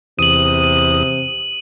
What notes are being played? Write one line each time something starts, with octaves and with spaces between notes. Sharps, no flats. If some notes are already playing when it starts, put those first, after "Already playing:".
E2 C3 D#6 D#7 F#7